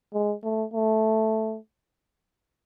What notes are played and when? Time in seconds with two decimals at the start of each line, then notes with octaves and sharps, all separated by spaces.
0.14 G#3
0.44 A3
0.73 A3